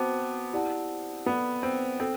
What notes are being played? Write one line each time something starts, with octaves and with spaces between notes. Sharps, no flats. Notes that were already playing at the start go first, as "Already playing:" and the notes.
Already playing: B3 C4 F#4 C5 F#5 A5 D6
E4 G4 D5 F#5 A5
B3 A4 D5 F#5
C4
C4 A4